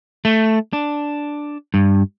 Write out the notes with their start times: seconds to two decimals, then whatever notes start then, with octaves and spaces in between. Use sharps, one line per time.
0.25 A3
0.73 D4
1.74 G2